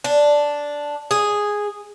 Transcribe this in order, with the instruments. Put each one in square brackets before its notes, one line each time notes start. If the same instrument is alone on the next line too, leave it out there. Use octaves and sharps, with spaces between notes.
[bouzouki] D4
G#4